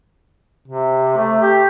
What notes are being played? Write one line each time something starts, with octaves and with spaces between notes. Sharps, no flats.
C3
A3
G4